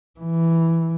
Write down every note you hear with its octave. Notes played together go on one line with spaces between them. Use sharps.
E3